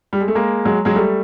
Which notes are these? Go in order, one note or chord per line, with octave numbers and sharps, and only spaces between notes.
G3
G#3
A3
G#3 A#3
F#3 G#3
F#3 G#3
G3 A3